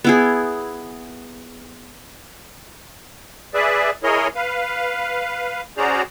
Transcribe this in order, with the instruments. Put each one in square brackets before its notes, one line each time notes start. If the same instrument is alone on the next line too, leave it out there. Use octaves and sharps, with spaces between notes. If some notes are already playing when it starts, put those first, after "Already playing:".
[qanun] B3 E4 G#4
[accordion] G#4 B4 D5 E5
E4 G#4 A#4 C#5 D#5
B4 F5
C#4 F#4 G#4 C5 D5 A#5